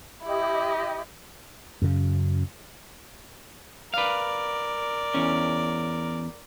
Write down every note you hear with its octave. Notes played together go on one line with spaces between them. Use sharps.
E4 G4 D#5
F#2 C#3
A#4 B4 D5 F5
E2 C#4